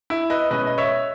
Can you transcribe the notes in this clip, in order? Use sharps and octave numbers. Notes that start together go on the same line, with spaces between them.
E4
B4 D#5
B2 G#3 C#4 B4 D#5
D#5
C#5 E5